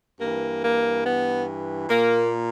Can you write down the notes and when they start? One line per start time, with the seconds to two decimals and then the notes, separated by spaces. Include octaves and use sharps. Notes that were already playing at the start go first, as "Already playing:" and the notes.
0.20 G2 E3 A#3
0.62 A#3
1.05 B3
1.89 A#2 A#3